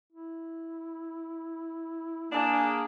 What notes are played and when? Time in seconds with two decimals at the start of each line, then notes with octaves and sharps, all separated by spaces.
0.13 E4
2.32 A#3 D4 G#4